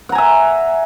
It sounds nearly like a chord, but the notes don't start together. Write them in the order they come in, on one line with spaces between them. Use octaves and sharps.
F#5 A#5 G#5 E5